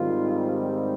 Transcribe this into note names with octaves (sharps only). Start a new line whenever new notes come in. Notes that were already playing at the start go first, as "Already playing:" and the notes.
Already playing: G#2 D#3 G3 C4 F4